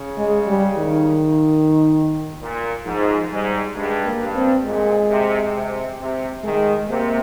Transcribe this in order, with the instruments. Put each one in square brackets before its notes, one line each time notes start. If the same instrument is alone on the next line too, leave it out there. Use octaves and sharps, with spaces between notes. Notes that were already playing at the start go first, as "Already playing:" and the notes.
Already playing: [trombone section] C#3
[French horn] G#3
G3
D#3
[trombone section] A#2
[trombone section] G#2 [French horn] F3
[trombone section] G#2 [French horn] G3
[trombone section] G2 [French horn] G#3
[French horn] A#3
[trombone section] G2
[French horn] C4
[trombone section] A#2 [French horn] G#3
[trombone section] C3
C3
C3
[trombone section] D#3 [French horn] G#3
[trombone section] C3 [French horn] A#3